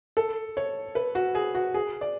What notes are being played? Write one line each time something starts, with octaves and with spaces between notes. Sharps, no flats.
A4
C#5
B4
F#4
G#4
F#4
G#4
D5